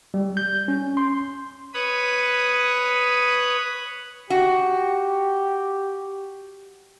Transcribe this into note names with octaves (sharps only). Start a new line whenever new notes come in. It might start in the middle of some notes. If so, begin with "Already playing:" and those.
G3
G6
C#4
C6
B4 C#5 B5 D#6
F#4 G4